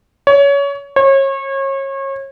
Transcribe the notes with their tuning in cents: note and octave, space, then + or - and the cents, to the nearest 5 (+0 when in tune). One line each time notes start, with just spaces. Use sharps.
C#5 +25
C#5 -30